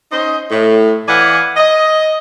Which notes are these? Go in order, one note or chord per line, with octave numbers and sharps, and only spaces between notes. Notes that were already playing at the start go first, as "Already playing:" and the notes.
C#4 D#4 C5 D#5
A2
E3 D5 F5 F#5 G#5
D#5